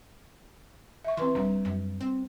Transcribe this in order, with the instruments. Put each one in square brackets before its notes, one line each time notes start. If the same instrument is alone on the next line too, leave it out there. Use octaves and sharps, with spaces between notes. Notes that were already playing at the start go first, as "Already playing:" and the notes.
[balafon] E5 C#6
[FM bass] E3 [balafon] C4 B4 C6
[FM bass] D#1 [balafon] G3 D4 A#5
[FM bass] F#2
C4